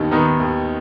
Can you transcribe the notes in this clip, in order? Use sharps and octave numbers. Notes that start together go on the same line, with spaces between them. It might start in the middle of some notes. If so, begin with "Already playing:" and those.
Already playing: D#2 D#3 B3 D#4
D#3 B3 D#4
D#2